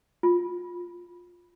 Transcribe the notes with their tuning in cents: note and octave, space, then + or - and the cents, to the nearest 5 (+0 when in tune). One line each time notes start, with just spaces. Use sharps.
F4 +10